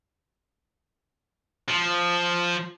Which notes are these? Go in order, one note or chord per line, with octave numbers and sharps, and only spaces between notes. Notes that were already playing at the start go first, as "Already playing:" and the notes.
F3